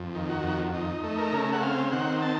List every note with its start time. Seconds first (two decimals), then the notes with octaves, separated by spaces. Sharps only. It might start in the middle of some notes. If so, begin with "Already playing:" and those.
Already playing: F2
0.15 D#3
0.29 F#4
0.44 F2
0.74 D#4
1.04 A3
1.18 A#4
1.33 C#3
1.53 F#5
1.63 C4 F5
1.92 D#3 F#5
2.22 A5